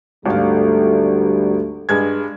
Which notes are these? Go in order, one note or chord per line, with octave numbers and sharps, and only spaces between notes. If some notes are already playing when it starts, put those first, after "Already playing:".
G#1 D2 G3 A3 F5
G2 G#3 G#6